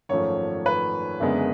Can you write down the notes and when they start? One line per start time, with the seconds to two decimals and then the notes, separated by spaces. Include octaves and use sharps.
0.09 G#1 F#2 F3 A3 C#5
0.66 B4
1.20 F#1 F#2 D3 G#3 B3